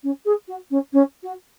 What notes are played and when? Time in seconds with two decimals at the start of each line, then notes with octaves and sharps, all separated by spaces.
0.03 C#4
0.25 G#4
0.48 F#4
0.70 C#4
0.93 C#4
1.23 F#4